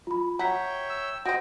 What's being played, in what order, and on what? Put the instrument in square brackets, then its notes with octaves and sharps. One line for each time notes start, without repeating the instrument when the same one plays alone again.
[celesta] F4 B5
[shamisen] F#4 [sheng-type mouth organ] C#5 E5 G5 [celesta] A#5 B6
[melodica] E6
[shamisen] F#4 C5 [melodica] D#5 G5